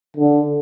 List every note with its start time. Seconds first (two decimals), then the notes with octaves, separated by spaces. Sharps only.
0.17 D3